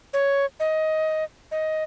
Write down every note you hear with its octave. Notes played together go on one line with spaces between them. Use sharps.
C#5
D#5
D#5